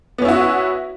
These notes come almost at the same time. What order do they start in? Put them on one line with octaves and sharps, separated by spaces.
B3 C#4 E4 F#4